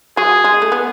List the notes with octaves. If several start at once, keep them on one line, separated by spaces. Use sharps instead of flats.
F#3 G#4
G#3
A3
B3